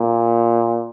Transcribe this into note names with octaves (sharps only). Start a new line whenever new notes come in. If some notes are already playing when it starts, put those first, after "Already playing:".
Already playing: A#2